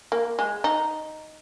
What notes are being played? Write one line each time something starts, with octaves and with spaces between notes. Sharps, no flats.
A#3
G#3
D#4